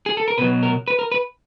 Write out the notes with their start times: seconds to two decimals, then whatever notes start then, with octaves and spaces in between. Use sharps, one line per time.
0.06 G#4
0.17 A4
0.28 A#4
0.38 B2 F#3 B4
0.63 A#4
0.88 B4
0.99 A#4
1.12 B4